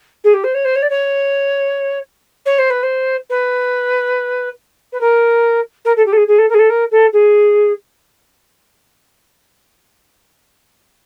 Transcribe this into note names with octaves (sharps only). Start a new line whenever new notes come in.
G#4
G4
C5
C#5
C5
C#5
D5
C#5
C#5
C5
B4
C5
B4
B4
A#4
A#4
A4
G4
A4
G#4
G#4
A4
A#4
G#4
A4
A#4
A4
G#4